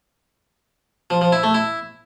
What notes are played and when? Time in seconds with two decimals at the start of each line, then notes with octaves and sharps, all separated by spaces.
1.10 F3
1.21 F3
1.32 E4
1.43 A3
1.54 E4